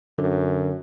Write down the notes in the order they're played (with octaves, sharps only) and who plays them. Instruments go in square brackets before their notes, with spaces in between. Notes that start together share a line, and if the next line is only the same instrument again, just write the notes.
[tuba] F#2 [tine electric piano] D3